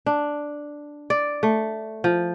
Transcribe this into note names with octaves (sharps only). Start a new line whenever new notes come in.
D4
D5
A3
F3